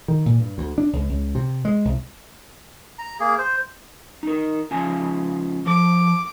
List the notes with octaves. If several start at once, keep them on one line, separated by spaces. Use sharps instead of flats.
D#3
A#2
G2
D2
D4
C#2
C#2
C3
G#3
C2
A#5
A#3 G#4
C5
D#4 A#4
C#3 F3 G#5
F3 D6